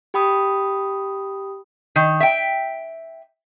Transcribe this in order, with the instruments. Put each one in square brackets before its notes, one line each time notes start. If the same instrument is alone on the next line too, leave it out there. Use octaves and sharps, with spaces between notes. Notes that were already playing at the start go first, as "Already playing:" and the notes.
[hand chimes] G4 G5 B5 D#6
[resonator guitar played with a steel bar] D#3
E5 G5